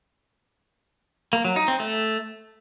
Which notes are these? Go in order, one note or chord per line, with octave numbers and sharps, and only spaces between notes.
A#3
F#3
D#4
C4
A3